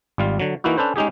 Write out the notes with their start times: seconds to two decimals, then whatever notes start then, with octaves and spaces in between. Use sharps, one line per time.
0.18 G#1 G3 F4 F5
0.40 D3 F#3
0.64 E3 A#3 D#4 E4 F#4
0.77 C#4 D4 A4 B4 C5
0.96 G#3 C#4 D#4 G4 G#4